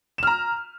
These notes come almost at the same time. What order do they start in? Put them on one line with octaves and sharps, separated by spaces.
E7 F6 A#5